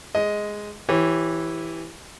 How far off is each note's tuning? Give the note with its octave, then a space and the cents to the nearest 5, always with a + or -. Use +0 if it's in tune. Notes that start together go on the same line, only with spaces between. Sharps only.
G#3 +0 D#5 +10
E3 +0 G4 +0 C#5 -25